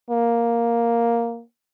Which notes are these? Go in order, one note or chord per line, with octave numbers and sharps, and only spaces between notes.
A#3